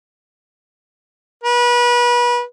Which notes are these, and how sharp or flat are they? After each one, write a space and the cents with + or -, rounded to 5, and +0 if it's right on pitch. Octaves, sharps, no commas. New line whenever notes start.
B4 -30